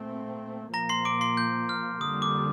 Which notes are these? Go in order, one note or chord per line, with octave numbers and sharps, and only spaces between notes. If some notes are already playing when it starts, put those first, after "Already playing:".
Already playing: A#2 A3 C4
A#2 F3 A#3 A#5 A#6
C6 C7
D6 D7
C6 C7
G6
F6
F2 D3 G3 A#3 D#6
D6